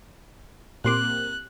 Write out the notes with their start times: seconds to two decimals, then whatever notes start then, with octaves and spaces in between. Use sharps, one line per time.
0.85 A#2 A#3 C4 G4 C6 D6 F#6